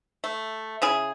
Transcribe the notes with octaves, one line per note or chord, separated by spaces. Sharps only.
A3
C#3 E4 G#4